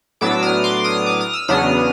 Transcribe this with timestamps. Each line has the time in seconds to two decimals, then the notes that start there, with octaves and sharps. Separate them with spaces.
0.21 A2 F#3 B3 D4 D6 E6
0.43 D#6 F6
0.64 C6 D6
0.84 D#6 F6
1.06 D6
1.21 D#6
1.33 E6
1.48 E2 C#3 F#3 B3 D4 D#6 F6